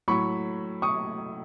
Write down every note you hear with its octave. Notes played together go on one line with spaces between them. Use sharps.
A2 F#3 B5 C#6
C#6 D#6